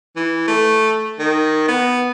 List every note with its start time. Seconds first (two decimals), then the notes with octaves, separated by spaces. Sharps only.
0.16 E3
0.48 A3
1.19 D#3
1.68 B3